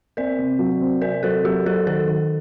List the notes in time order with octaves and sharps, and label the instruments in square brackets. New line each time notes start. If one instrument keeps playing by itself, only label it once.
[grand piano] C4 [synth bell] A#4 D5
[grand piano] C3
F#3
C4
[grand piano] C3 [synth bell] A#4 D5
[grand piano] F#3 [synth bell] A4 C5
[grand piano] F#3 [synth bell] G4 A#4
[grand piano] F#3 [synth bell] A4 C5
[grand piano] D#3 [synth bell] A4 C5
[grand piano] D#3